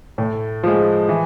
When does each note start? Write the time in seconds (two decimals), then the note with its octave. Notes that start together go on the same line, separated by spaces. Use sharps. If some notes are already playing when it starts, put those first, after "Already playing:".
0.18 A2
0.63 F3 G#3
1.08 E3